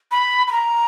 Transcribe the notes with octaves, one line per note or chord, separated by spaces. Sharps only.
B5
B5
A#5